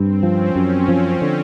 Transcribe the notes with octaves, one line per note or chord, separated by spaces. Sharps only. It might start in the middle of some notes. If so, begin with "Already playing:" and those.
Already playing: G2 C4
F3 C#4
F#2 C4
F3
D3